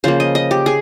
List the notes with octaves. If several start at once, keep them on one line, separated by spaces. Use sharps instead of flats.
C#3 F3 A#3 C5
D#5
D#5
G4
G#4